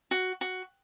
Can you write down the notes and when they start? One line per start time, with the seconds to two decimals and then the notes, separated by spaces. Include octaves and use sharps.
0.11 F#4
0.41 F#4